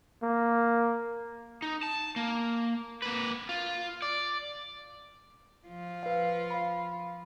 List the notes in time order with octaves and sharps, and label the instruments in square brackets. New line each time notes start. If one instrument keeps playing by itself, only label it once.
[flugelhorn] A#3
[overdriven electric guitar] D#4
A5
A#3
A#3 B4
F4
D5
[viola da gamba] F3 F4
[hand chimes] B4 F5
F5 B5